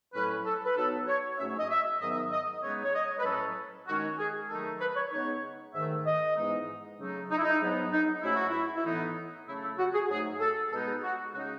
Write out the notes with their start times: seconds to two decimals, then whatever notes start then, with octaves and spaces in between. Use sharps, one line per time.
0.14 A2 F#3 C#4 B4
0.45 A4
0.64 B4
0.76 B2 F#3 B3 D#4 A4
1.07 C#5
1.38 G#2 F#3 A3 C#4 E5
1.49 C#5
1.59 D#5
1.70 E5
2.00 G#2 D#3 F#3 B3 D#5
2.09 E5
2.16 D#5
2.31 D#5
2.62 C#3 G#3 B3 D#4 C#5
2.85 C#5
2.95 D#5
3.19 B4
3.25 A2 F#3 C#4 A4
3.88 D#3 G#3 C#4 F#4
4.18 G#4
4.49 D#3 F#3 A3 D#4 A4
4.80 B4
4.96 C#5
5.12 C#3 G#3 B3 D#4 C#5
5.74 G#2 D#3 A3 E5
6.06 D#5
6.36 G#2 E3 G#3 B3 D#4
6.98 C#3 F#3 A3 D#4
7.30 D#4
7.37 E4
7.43 D#4
7.61 G#2 F#3 B3 D#4
7.92 D#4
8.22 G#2 F#3 A3 C#4 E4
8.36 F#4
8.49 E4
8.77 E4
8.85 A2 E3 B3 D#4
9.48 C#3 F#3 A3 E4
9.63 E4
9.78 F#4
9.94 G#4
10.09 G#2 F#3 A3 D#4 G#4
10.40 A4
10.71 B2 G#3 B3 D#4 A4
10.87 G#4
11.03 F#4
11.33 C#3 G#3 D#4 F#4